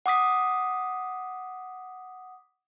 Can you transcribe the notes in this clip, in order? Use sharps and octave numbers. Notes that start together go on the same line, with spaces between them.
F#5 D6 D#6 B6